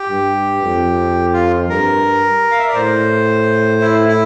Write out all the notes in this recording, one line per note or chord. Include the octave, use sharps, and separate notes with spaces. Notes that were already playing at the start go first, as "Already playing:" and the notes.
Already playing: G4
G2
F2
F4
G2 A#4
F5
E5
D5
A2 C5
E4
E4